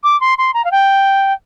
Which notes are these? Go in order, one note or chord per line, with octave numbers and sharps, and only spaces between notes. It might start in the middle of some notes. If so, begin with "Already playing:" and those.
D6
C6
C6
A#5
F5
G5